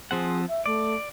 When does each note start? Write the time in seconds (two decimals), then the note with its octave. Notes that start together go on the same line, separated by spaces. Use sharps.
0.11 F3 C4 G#4 F#5
0.48 E5
0.66 A3 D5